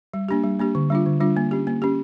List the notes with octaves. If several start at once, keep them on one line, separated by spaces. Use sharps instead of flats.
G3
A#3 D4 G4
G3
A#3 D4 G4
D3
G3 D4 F4
D3
G3 D4 F4
A#3
C#4 G4
A#3
C#4 G4